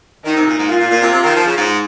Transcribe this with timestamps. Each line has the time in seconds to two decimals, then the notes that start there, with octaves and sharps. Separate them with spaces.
0.25 D#3 D#4
0.36 C3
0.47 A#2
0.58 G#2
0.69 A#2 F4
0.80 A#2
0.90 A#2
1.02 C3
1.12 C3
1.24 D#3
1.34 F3
1.45 C#3
1.57 G#2